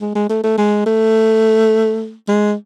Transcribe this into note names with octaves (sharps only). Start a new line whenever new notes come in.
G#3
G#3
A3
A3
G#3
A3
G#3